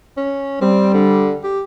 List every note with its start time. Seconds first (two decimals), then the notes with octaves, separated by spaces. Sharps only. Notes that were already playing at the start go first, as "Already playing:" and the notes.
0.17 C#4
0.61 G3 C4
0.94 D3
1.44 G4